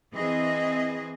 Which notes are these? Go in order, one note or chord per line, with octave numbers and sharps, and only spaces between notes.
E3 C4 G#4 D#5